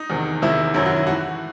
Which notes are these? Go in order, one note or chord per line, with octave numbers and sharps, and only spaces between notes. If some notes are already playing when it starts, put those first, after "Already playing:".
Already playing: D#4
E2 C3 D#3
E2 C3 D#3 E4
F#2 D#3 F#3 E4
F#4
E4
A2 E3 F#4